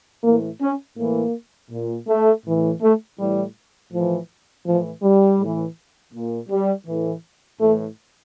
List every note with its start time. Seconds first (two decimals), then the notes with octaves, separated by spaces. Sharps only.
0.23 A2 E3 A#3
0.61 C#4
0.97 A2 E3 A#3
1.71 A#2
2.08 A3
2.45 A2 E3
2.81 A3
3.19 A2 E3 G3
3.92 A2 E3 F3
4.65 A2 E3 F3
5.02 G3
5.39 A2 E3
6.12 A#2
6.49 G3
6.87 A2 E3
7.60 A2 E3 A3